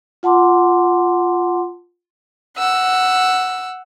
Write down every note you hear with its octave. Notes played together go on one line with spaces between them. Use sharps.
F4 F#5 A5 C6 D6
F#5 E6